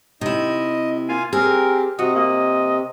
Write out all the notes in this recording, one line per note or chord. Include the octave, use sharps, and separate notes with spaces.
C3 D#4 E4 D#5
A#3 F4 F5 G#5
C4 G4 G#4 A#4
C3 F3 F#4 D#5
A#3 D#5